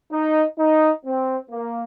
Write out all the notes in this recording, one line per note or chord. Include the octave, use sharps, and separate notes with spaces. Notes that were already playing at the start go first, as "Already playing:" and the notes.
D#4
D#4
C4
A#3